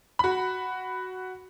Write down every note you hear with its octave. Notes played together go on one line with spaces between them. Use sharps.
F#4 B5